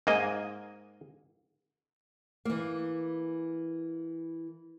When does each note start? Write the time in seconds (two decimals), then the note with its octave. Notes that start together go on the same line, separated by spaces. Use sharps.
0.07 G#2 A#3 D#5 G#5
2.45 E3 A#3